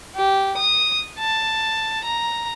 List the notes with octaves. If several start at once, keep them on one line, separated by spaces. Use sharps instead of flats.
G4
D#6
A5
A#5